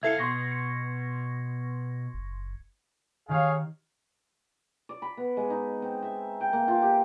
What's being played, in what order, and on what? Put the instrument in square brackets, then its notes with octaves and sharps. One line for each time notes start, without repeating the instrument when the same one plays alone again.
[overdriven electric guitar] C2 F5 [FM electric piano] E4 A4 E5 [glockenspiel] G#6 C7 C#7
[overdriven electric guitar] B2 [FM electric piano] C6 C#6 A#6
[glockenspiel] C#7
[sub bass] F#1
[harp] D#3 G4 F6 [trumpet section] G#4 C#5 F5
[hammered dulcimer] D5
B5
B3
G#3
D#4
C4
E5
G5
A#3
F4
G4